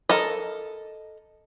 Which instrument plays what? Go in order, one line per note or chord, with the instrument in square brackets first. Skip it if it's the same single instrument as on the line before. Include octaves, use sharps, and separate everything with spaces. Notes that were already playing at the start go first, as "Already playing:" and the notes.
[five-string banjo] A4 A#4 D#5